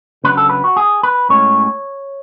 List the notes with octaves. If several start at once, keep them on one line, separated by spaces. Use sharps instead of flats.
C#3 F#3 B3 D4 B4
A4
B4
F#4
G#4
B4
A2 G#3 C#4 C#5